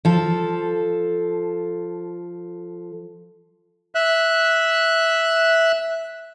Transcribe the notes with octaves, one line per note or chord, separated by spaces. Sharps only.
F3 A4
E5 F#6